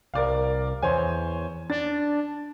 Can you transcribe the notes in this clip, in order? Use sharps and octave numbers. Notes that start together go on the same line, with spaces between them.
C2 A#4 D5 F5
E2 C5 C#5 G#5
D4 A6